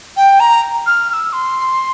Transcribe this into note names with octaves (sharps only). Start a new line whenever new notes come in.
G5
A#5
F6
F6
E6
C6